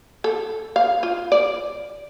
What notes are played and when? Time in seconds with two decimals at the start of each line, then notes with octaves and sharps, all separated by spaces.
0.24 A4
0.76 F5
1.03 F4
1.32 D5